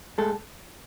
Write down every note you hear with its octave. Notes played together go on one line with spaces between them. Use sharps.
A2 G#3 A4